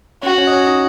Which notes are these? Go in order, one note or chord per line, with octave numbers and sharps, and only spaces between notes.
C#4 F#4 C#5
C#4 C#5
D#5
C#4 C#5
D#4 D#5